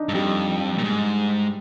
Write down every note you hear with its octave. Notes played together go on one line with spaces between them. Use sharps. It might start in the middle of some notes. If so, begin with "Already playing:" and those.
Already playing: D4 D#4
G2
F2 G3
A#2
G#2